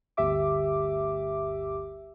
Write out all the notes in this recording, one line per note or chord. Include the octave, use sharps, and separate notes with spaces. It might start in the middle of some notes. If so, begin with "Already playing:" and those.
G1 D2 G4 E5 D6